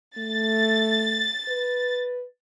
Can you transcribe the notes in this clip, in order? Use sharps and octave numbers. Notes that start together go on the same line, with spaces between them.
A3 A6
B4